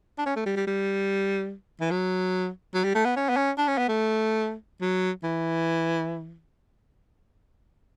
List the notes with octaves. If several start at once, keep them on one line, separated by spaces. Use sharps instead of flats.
D4
C#4
A3
G3
G3
G3
E3
F#3
F#3
G3
A3
B3
C#4
B3
C#4
D4
C#4
B3
A3
F#3
E3